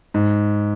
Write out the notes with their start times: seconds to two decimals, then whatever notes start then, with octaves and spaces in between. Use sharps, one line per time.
0.14 G#2